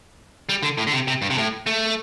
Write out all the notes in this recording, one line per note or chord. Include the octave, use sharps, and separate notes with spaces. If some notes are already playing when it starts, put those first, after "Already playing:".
G3
D3
A2
D3
C3
C3
G2
C3
A2
A3